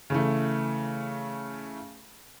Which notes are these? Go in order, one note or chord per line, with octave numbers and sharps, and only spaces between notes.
C#3 E3 A3